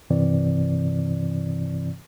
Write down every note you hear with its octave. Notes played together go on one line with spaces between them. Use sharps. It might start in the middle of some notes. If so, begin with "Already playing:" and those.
G2 C3 E3 C4 D5